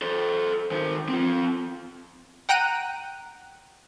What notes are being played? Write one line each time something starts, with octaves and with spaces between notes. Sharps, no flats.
A4 C5
D#3 C5
C4 F4
F#5 G5 A#5 F#6 D#7